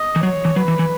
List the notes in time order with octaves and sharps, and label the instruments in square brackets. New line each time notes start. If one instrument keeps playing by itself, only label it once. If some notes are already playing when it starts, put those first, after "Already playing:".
Already playing: [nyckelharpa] D#5
[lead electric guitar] E3
[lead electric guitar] F#3 [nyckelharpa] C#5
[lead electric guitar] E3
[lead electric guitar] F#3 [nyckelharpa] B4
[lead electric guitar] E3
E3